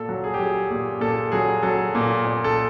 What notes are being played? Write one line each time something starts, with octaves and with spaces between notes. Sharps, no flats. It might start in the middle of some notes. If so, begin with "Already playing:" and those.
Already playing: A#2 A4
F#3
G#4
G4
F#3 G#4
A#2 G#4
A#2 A4
F#3 G#4
F#3 A4
A#2
A#2
A4